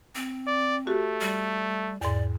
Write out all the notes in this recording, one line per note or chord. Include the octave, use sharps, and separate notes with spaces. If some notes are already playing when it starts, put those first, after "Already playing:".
C4
D5
A3 F#4 G4 A4
G3
E2 G#2 D5